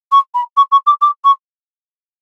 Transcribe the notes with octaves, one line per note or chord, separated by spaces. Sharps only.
C#6
B5
C#6
C#6
D6
D6
C#6